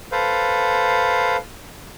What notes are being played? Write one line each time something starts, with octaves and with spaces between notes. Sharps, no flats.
A4 B4 C5 F5